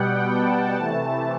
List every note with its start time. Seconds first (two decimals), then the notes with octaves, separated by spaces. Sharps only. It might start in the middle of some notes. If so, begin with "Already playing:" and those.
Already playing: B2 G3 B3 F#5 G5
0.31 A5
0.76 C3 E3 A3